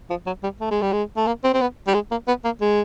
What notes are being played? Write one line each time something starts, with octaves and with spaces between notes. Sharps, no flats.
F3
F#3
G3
A3
G#3
G3
G#3
A3
A#3
C4
C4
B3
G3
G#3
A#3
B3
A#3
G#3